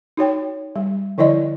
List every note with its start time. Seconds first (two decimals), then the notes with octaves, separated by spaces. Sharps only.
0.17 D#4 F#4 C#5 G5
0.76 G3
1.18 D3 F3 E4 D5 D#5